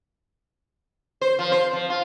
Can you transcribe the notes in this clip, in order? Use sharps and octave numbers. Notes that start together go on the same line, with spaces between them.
C5
F3
C5
F3
F4